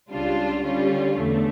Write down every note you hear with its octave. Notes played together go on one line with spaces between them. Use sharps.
C#2 C#3 G3 D4 F4
D3 G3 C#4 F4
E2 D3 A3